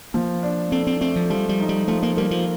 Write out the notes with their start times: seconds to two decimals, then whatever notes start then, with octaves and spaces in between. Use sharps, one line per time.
0.14 F3 A#3
0.43 D4
0.72 C4 A4
0.87 C4
1.01 A3 C4
1.16 F3
1.30 F3 G3
1.49 G3
1.60 D#4
1.69 G3
1.88 F3 A3
2.03 A#3
2.17 G3 A#3
2.31 F3